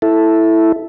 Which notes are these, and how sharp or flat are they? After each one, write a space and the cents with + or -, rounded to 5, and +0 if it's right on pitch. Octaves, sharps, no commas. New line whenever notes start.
E4 +0 A4 +0